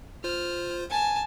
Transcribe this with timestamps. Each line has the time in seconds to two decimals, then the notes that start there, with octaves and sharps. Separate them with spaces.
0.24 F4 C5 F6
0.90 G#5 A5